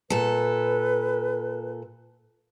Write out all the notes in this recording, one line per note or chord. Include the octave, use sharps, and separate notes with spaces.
A#2 A4 B4